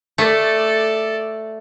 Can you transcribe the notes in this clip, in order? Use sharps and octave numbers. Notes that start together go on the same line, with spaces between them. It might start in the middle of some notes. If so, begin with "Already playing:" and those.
A3 A4 D5